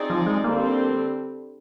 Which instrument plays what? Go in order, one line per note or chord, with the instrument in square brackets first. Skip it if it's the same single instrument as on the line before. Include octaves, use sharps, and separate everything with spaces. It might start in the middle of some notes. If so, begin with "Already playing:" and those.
Already playing: [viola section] C4 D#4 G#4 D5
[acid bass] F3
G#3
[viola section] D3 G3 C4 [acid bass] A#3